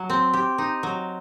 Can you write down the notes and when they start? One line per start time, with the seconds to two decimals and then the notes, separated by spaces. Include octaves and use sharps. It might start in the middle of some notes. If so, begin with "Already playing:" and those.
Already playing: F#3
0.10 C4
0.34 G4
0.58 D#4
0.83 F#3